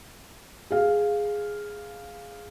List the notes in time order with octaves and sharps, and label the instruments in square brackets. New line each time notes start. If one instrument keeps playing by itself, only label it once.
[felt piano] G#4 F5